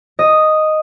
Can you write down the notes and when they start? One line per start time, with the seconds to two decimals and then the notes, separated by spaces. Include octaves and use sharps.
0.19 D#5